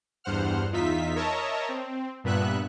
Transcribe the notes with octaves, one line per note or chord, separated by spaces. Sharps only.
E2 G2 C5 F#5 F6
E2 D#4 F4 E5 B6
A#4 C#5 D#5 E5 A5 A#5
C4
G2 A#2 B3 E5 F#6